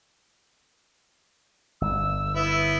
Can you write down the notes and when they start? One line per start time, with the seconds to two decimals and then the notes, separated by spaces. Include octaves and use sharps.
1.81 G1 E6
2.36 B3 E4